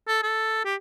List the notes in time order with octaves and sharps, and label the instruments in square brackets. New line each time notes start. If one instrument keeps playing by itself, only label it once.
[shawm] A4
A4
G4